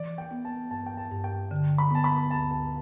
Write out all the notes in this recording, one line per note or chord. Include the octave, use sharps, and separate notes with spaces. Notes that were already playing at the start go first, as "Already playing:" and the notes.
Already playing: E3 D5
G5
B3
A5
G2 A5
G5
A5
G2
G5
D3
B5
B3 A5
B5
D2 A5
A5